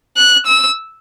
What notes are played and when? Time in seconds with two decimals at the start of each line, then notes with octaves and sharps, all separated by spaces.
0.17 F#6
0.46 E6